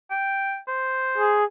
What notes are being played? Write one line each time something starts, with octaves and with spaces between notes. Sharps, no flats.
G5
C5
G#4